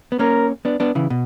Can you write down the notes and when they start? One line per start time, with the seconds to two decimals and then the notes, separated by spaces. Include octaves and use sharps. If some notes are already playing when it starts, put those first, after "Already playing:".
0.12 B3
0.19 A#3 C#4 A#4
0.65 B3 D4
0.80 B3 D4
0.95 C#3 E3
1.10 B2